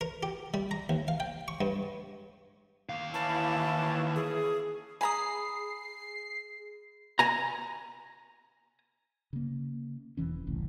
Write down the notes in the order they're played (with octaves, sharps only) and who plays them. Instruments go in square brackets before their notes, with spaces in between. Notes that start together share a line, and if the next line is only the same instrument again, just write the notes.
[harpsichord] A#4
G4
G3
A#5
D#2
F5
G5
C#6
G2
[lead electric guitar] D#2 F5
[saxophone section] E3 C#4 E4 [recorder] A5
[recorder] G#4
[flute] G#4 [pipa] G#5 A#5 [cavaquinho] B5 D#6 [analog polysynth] C7
[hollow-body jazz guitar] G#5 A#5
[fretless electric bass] C#3 A#3
E1 E3 C#4
F#1 C2 A2